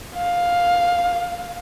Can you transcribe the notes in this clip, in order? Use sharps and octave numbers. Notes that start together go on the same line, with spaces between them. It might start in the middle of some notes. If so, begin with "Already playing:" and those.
F5